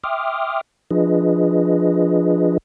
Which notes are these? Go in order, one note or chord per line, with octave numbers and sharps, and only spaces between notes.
E5 G5 C6 D6 D#6 F6
F3 D4 F4 G#4 B4 D#5